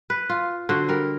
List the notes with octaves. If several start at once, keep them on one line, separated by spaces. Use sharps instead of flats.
B4
F4
D3 F#4 C5
G3 A#4